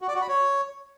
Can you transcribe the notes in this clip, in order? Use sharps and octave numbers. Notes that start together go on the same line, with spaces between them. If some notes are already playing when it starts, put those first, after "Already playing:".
F#4
D5
F#4
B5
C#5